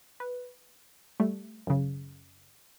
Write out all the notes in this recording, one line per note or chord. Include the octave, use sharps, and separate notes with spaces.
B4
G3 A3
F#2 C#3